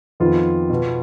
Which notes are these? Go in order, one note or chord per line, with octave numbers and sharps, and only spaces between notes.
F2 D#3 B3 F4
B2 B3